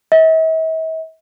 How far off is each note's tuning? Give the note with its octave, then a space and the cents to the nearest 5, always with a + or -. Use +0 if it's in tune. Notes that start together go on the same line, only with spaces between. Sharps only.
E5 -45